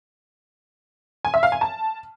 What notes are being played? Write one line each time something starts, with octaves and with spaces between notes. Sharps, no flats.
G#5
E5
F5
G#5
A5